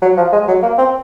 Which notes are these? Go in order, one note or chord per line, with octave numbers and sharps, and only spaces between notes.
F#3
F3
G#3
F#3
A#3
C4